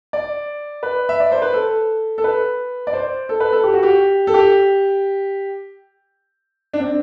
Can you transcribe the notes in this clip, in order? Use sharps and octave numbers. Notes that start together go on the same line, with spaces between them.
D5
B4
E5
D5
C5
B4
A4
A4
B4
D5
C5
A4
B4
A4
G4
F#4
G4
A4
G4
D4
C4